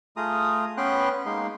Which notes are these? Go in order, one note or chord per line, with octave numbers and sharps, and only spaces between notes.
A3 F4 G#4 A#5 D#6
B3 C#4 B4 G5 C6 F#6
G#3 A#3 D#4 C6